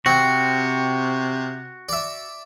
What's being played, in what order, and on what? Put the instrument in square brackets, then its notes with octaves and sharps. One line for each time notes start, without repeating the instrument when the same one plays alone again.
[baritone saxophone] C3 [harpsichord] C4 [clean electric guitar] F#4
[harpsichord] D5 E5